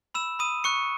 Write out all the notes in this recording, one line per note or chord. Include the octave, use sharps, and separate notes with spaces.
B5 E6 E7
B5 D#6 D#7
C#6 F#6 C#7